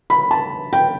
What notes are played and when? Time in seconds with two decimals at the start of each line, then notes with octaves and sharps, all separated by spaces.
0.10 B5
0.31 A5
0.73 G5